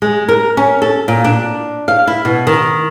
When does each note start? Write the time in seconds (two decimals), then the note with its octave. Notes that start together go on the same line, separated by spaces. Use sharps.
0.02 G#3
0.29 A#4
0.57 C#4
0.82 A4
1.08 A#2
1.24 D4
1.88 F5
2.07 E4
2.25 B2
2.47 D#3